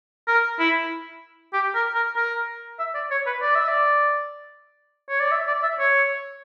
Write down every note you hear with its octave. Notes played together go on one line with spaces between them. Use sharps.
A#4
E4
G4
A#4
A#4
A#4
E5
D5
C#5
B4
D5
E5
D5
C#5
D5
E5
D5
E5
C#5